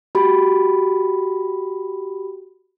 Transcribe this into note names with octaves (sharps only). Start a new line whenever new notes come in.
F#4 G4 B5